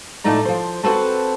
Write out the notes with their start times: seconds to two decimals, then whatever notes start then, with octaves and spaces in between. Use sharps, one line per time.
0.24 A2 F3 A3 D#4 D5 A#5
0.45 F3 C5
0.83 C4 F#4 A4 B4 C5 A5